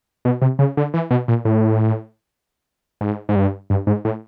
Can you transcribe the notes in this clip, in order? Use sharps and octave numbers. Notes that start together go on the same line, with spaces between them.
B2
C3
C#3
D3
E3
B2
A#2
A2
G#2
G#2
G2
G2
G#2
A2